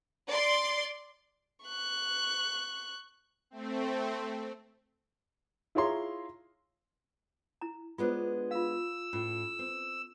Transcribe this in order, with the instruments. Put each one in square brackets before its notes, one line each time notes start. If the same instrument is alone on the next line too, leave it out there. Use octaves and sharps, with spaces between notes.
[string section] D5 C6
[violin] C#6 F#6
[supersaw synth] A3 C4
[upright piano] E4 F4 G#4 C#5 A#5 C6
[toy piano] E4 A#5
[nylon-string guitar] G#3 B3 D4 [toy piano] F4 C5
[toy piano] F4 F5 [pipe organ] E6
[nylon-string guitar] A2 [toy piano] C#4 F4
[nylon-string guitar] C4